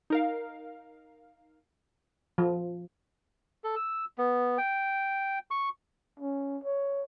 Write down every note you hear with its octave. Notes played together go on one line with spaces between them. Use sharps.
D#4 A#4 F5
F3
A4
E6
B3
G5
C#6
C#4
C#5